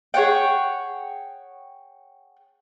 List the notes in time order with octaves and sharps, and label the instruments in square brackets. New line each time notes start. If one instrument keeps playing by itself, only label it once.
[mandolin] G#4 C#5 F#5 G5